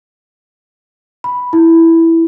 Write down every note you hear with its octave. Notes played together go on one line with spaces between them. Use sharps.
B5
E4